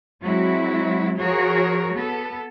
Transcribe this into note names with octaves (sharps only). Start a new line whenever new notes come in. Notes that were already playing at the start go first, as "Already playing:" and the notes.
F#3 G#3 C4 E4 F#4
F3 F#4 G#4 A#4 C#5
B3 A4